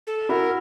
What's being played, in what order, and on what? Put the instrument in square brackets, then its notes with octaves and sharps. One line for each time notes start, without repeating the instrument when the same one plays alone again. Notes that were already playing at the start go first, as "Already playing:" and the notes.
[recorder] A4
[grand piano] E4 F#4 [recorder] A#4